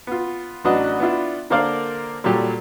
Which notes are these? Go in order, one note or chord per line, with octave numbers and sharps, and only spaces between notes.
B3 F4
A1 F#3 D4 F#4 B4 D#5
B3 D4 E4 F4
D3 A#3 A#4 C5 D5 F5
A#2 F#3 G3 G4 A4